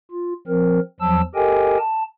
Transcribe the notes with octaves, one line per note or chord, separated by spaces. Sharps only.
F4
F3 C4 A#4
E2 F3 F#3 A5 E6
G4 A4 A#4 D#5 G5 G#5
A5